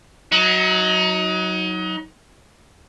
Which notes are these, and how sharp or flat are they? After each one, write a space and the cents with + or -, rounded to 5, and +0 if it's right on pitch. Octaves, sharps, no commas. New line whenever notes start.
F#3 +0 D#4 +30